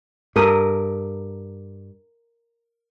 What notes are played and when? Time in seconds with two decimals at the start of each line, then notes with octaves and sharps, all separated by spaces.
0.36 G2 A4 A#4 D#6